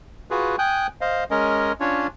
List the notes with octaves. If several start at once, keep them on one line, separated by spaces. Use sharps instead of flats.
F4 F#4 G#4 B4
G5 G#5 D#6 F#6 G6
C5 D#5 F5
G#3 C#4 A#4 D#5
C#4 D4 F4 C#5